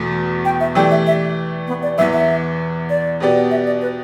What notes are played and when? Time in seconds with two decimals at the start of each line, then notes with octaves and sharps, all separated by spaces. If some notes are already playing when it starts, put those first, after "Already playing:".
Already playing: E2 B2 A3
0.45 G5
0.60 E5
0.75 E3 A3 G4 D5 G5
0.91 E5
1.07 E5
1.67 B3
1.82 D5
1.98 E2 E3 B3 E5
2.13 E5
2.90 D5
3.20 B2 B3 G4 D5
3.51 E5
3.67 D5
3.82 B4